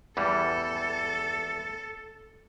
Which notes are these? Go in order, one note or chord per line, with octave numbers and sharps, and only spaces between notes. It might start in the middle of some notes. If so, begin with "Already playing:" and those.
E2 E3 G3 A4